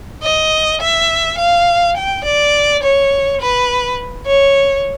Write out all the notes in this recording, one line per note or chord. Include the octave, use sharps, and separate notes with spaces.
D#5
E5
F5
G5
D5
C#5
B4
C#5